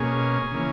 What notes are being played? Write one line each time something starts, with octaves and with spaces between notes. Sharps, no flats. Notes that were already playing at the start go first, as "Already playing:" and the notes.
Already playing: B2 A#3 C#4 G#4
C#3 E3 A#3 C#4